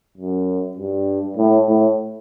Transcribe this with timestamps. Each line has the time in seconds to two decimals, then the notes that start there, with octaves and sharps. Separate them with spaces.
0.17 F#2
0.77 G2
1.37 A2
1.68 A2